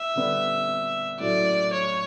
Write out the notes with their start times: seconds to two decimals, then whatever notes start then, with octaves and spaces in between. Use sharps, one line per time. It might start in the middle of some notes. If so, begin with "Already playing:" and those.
Already playing: E5
0.16 D3 G3 B3
1.20 A2 F#3 A3 D5
1.73 C#5